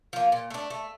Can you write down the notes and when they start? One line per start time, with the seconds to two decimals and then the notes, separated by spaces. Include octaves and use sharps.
0.13 F3 A#3
0.32 A#2
0.50 A3 D4
0.70 A3